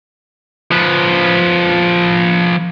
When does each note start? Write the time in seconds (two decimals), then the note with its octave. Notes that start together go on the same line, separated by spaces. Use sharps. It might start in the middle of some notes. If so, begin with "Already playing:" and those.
0.71 F3 B4